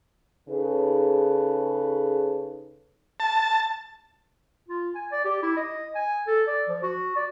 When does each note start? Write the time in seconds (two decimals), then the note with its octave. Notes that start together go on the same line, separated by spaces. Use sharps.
0.49 C#3 D#4 G#4 A4 B4
3.20 A5
4.69 F4
4.95 G#5
5.12 D5
5.25 G4
5.43 E4
5.57 D#5
5.95 G#5
6.27 A4
6.47 D5
6.69 F3
6.83 F#4
7.16 D5